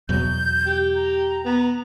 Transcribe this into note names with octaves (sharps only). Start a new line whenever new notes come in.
E2 B2 F#3 G6
G4
A#5
B3